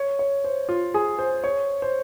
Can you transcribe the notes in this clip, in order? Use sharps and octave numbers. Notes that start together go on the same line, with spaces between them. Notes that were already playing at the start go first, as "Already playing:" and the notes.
Already playing: C#5
C#5
C5
F4
G#4
C5
C#5
C5